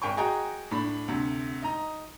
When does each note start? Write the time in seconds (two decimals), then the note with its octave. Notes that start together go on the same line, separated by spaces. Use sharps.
0.02 G#1 A#4 G5 G#5 C#6
0.17 F#4 G#4 D#5 G5 G#5 A#5
0.71 A2 D4 B5
1.08 D2 C3
1.62 D#4 D#5 A#5